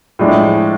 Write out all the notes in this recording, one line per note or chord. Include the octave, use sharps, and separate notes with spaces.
A2 F3 G#3 D4